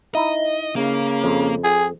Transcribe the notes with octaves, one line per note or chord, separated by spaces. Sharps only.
D#4 E4 D#5
C#3 A#3
F2
G#4